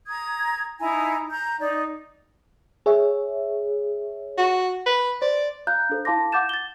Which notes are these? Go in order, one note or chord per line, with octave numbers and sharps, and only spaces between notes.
A#5 D#6 G#6
D#4 E4 G#5 A#5
A#5 G6
D#4 D5
G#4 C#5 E5
F#4
B4
C5 D5
F5 A#5 F#6 G6
D4 A4 C5
E4 F5 A5 C6 D6 A#6
F#5 D6 G6 A6 E7
A6 G7